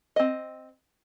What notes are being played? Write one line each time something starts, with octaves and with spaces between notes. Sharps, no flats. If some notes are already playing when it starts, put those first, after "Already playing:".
C4 D#5